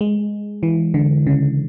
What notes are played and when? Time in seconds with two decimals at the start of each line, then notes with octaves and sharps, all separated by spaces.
0.01 G#3
0.63 E3
0.94 D3
1.27 C#3